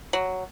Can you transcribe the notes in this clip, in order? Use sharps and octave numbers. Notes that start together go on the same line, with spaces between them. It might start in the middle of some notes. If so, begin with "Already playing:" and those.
F#3